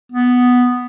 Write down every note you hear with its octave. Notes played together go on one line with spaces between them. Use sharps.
B3